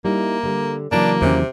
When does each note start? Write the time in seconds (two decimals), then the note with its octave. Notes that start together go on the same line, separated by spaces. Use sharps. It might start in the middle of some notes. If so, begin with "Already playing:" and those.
0.05 G3 A#3 D#4 E4
0.43 D3 G3
0.92 C#3 E3 F#3 A#3 D4
1.22 E2 C3 D#3 C#4